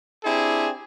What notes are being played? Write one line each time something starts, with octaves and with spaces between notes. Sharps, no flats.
C4 D4 E4 G4 G#4